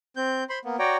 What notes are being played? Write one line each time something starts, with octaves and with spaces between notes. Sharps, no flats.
C4 G6
C5 B5 C6
A#3 B3
F#4 C#5 D5 G5 A#5